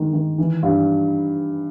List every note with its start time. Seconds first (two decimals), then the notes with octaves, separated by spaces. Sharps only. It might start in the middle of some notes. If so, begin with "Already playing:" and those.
Already playing: D#3 G#3
0.13 D#3
0.38 E3
0.63 G2